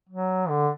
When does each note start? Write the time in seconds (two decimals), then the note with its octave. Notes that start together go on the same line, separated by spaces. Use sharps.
0.09 F#3
0.49 D3